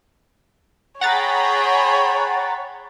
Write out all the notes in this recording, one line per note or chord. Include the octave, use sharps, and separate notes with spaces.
G#4 C#5 F#5 G5 A#5 B5 A6